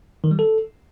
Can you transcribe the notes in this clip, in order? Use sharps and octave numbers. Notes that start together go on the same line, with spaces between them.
D#3
G3
A4